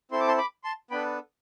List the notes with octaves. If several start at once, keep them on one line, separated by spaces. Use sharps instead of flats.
C4 E4 A4 C6
D6
A5 C6
B5 D6
A5 C6
B3 D4 A4 G5 B5